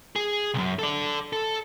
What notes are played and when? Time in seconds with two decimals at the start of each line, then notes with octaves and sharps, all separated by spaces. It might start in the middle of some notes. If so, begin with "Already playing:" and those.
0.16 G#4
0.54 C2 F#2
0.79 A4 D5
1.33 A4